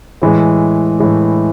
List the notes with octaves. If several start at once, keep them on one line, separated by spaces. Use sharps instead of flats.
A2 E3 G#3
A2 E3 G#3